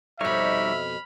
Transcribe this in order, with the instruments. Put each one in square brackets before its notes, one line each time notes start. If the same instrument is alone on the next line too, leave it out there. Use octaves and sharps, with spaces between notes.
[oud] F2 B2 [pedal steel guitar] G3 D#4 C#5 [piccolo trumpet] E5 [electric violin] B5 F6